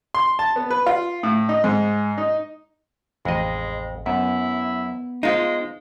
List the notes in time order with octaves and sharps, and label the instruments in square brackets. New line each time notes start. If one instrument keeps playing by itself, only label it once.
[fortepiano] C6
A5
B3
B4
F4
A2
D#4
G#2
D#4
[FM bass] A1 [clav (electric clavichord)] F2 D#5 [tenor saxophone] G#3
[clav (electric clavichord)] F#2 [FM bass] B3 [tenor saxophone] E4
[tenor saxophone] G#3 [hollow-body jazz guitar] D#4 F4 [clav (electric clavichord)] C5